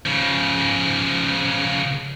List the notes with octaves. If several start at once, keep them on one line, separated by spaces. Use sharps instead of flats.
C#3 F3